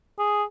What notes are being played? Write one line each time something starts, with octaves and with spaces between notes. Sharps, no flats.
G#4